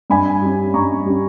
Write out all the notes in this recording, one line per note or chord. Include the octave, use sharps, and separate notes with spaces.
G2 G#5 B5
G3 C#4
G2 A#5 C#6
G3 C#4